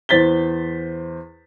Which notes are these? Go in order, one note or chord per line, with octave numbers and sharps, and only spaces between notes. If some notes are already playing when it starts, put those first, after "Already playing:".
E2 C5 A6 B6 G7